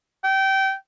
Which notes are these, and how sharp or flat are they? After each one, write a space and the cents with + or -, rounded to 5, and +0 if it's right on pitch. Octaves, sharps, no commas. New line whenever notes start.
G5 -20